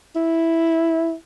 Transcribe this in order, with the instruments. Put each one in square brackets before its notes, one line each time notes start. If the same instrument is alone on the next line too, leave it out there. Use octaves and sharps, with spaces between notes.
[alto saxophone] E4